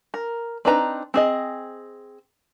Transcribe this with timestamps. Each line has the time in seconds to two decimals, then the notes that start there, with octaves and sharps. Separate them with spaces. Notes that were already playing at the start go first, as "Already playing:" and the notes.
0.14 A#4
0.65 C4 D4 D#4 B4 A#5
1.14 C4 G#4 D#5